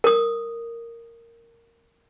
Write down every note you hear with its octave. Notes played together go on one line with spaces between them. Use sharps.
A#4 D#6